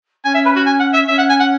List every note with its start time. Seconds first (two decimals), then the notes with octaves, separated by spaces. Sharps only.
0.24 C#4 G#5
0.34 E5
0.45 B4
0.56 F#4
0.66 G#5
0.80 F#5
0.93 E5
1.08 C#4 E5
1.18 F#5
1.29 G#5
1.40 F#5